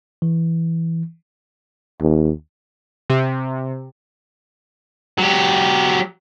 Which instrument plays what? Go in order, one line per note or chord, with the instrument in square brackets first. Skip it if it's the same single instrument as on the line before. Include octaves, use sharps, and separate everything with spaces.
[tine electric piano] E3
[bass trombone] D#2
[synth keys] C3
[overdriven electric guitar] F#3 G4